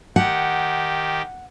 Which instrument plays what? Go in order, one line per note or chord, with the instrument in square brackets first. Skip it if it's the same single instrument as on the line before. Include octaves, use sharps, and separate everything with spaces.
[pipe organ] D#3 G4 [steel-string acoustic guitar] F#5